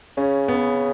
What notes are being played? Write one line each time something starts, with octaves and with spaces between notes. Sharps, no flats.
C#3 C#4
B3